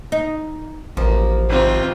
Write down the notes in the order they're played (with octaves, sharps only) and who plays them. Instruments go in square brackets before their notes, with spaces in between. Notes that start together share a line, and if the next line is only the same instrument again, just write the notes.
[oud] D#4
[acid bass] A1 [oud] F3 [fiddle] A#3
[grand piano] G#1 C3 [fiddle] C4 F4